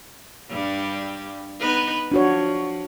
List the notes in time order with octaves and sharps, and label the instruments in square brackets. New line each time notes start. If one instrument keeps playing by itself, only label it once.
[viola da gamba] G2 G3 G4
B3 D#4 B4
[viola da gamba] F3 [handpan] D4 F#4 C#5